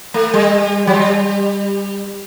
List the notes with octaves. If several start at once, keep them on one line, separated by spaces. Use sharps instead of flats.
A3
G3
F#3
G3